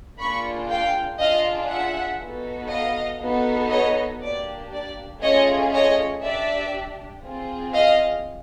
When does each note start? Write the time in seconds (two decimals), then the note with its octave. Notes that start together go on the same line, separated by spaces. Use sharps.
0.19 A#3 D4 F4 G#4 B5 C#6
0.70 F5 G5
1.20 D4 F4 G#4 D#5 F5
1.70 E5 F#5
2.21 B3 D#4 F#4 A4
2.71 D#5 F5
3.21 B3 D#4 F#4 A4
3.71 C#5 D#5
4.22 A#3 D4 G4 D5
4.73 D5
5.22 A3 C#4 F4 G#4 C#5 D#5
5.73 C#5 D#5
6.23 D4 G4 D5 E5
7.24 C4 F4 G#4
7.74 D#5 F5